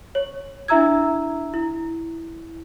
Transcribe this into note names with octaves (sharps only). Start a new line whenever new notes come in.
C#5
D4 E4 E5 A#5 E6 G#6
E4